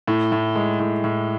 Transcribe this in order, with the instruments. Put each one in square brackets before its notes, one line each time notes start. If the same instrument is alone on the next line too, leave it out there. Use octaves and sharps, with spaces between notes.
[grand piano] A2
A2
G#3
A2
A2